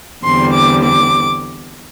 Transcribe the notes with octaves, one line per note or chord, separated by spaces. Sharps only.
E2 D3 G3 C4 C6
D6
D6